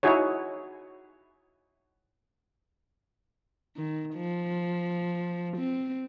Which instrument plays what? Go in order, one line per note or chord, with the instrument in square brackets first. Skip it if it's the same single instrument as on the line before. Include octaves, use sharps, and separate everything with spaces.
[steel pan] D#4 E4 F#4 G#4 C#5
[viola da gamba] D#3
F3
C4